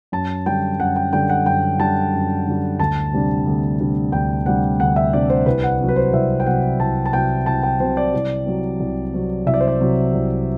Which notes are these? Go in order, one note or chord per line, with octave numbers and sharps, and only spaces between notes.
F#2 A5
D3 G3 G5
F#2 F#5
G5
D3 G3 G5
F#5
F#2 G5
D3 G3 A5
F#2
D3 G3
D2 A5
C3 G3 D4
D2
C3 G3 D4
D2 G5
C3 G3 D4 F#5
D2 F#5
E5
C3 G3 D4 D5
C5
C2 B4
F#5
C3 F#3
B4
C5
C2 E5
G5
C3 F#3 F#5
C2 A5
A5
C3 F#3 G5
C2 A5
G5
C3 F#3 C5
D5
C2
C3 F#3
C2
C3 F#3
C2 E5
D5
C5
D5
C3 F#3
C2